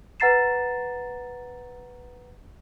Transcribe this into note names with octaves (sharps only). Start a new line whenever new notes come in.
B4 F#5 A#5 A6 C7 E7